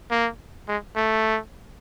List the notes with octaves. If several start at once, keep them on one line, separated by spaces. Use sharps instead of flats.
A#3
G#3
A3